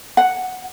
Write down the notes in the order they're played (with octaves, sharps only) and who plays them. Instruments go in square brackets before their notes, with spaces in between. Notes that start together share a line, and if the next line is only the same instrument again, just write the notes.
[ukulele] F#5